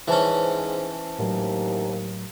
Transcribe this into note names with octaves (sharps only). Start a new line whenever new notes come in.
G#2 E3 C#4 C5 A5
D#2 A2 F#3